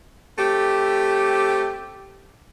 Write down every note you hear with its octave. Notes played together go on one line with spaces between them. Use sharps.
A3 C4 G4